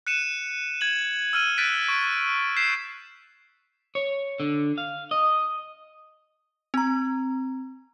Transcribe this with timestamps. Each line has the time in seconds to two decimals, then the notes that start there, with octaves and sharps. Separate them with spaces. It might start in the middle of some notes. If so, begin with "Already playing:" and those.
0.07 F#6 C#7 D#7 E7
0.81 G#6 F#7
1.33 E6 F6 D#7
1.58 F#6 A6 B6 D7 D#7
1.88 C#6 D7
2.57 G6 B6 C7 E7
3.95 C#5
4.40 D3
4.78 F5
5.11 D#5
6.74 C4 A#5